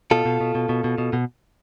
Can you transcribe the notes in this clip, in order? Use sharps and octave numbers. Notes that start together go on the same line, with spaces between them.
B2 F4 A4
B2
B2
B2
B2
B2
B2
B2